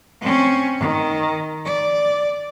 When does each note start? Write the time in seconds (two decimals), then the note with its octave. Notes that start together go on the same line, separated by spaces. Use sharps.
0.21 C4 C#4
0.79 D#3
1.65 D5